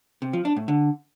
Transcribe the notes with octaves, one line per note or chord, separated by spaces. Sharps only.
C3
F3
D4
A2
D3